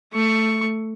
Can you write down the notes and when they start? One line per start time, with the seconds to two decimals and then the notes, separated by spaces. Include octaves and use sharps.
0.13 A3 C#6